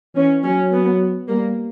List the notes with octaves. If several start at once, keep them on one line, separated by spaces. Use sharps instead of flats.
E3 C#4
F#3 C#4
B3
G3 A#3